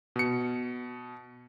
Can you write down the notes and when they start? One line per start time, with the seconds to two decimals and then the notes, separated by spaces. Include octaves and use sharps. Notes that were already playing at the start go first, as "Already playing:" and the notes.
0.16 B2 C#7